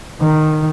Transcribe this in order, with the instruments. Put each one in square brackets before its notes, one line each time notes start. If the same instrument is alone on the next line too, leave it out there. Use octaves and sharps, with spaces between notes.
[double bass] D#3